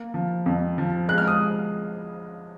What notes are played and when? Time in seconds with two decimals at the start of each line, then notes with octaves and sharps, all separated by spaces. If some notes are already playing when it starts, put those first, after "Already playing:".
Already playing: A#3
0.14 F3
0.46 F2
0.78 F3
1.09 G#3 F#6
1.18 F6
1.28 D#6